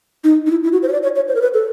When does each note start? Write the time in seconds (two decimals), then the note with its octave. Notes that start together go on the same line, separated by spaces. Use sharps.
0.24 D#4
0.46 D#4
0.51 E4
0.64 E4
0.72 F#4
0.83 C5
0.88 C#5
0.93 D5
1.03 C#5
1.16 C#5
1.28 C5
1.35 A#4
1.42 B4
1.54 A4